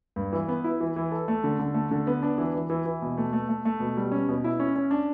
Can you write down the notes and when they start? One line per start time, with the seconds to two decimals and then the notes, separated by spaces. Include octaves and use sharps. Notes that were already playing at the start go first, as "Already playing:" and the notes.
0.16 G2
0.33 E3
0.49 B3
0.64 E4
0.81 E3
0.96 E3
1.12 A4
1.28 A3
1.44 D3
1.59 D3
1.74 A3
1.91 D3
2.07 B3
2.23 D4
2.38 E3
2.54 E3
2.70 E3
2.86 E3
3.02 B2
3.17 A3
3.33 A3
3.49 A3
3.65 A3
3.80 B2
3.97 G3
4.12 C#4
4.29 B2
4.44 E4
4.60 C#4
4.75 C#4
4.91 D4